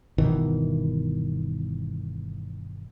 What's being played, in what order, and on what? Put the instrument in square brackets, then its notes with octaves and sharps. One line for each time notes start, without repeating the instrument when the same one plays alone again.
[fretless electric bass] G1 B2 D#3 E3